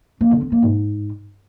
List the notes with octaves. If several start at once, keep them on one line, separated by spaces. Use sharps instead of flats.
A#3
D3
B3
A#3
G#2